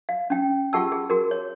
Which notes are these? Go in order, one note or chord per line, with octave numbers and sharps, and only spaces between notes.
F5
C#4 G5
F4 G4 G#4 F#5 A5 E6
G#4
F#4 G#4 A#4
C#5